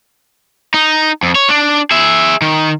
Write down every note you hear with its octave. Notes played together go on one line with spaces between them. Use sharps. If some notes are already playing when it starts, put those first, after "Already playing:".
D#4
F2
C#5
D4
G#4 E5
D#3